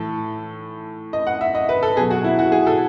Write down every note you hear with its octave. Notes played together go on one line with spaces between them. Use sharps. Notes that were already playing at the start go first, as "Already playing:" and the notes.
Already playing: A2 E3 A4
D#5
F#5
E5
D#5
B4
A4
B2 F#3 G#4
F#4
E4
F#4
G#4
A4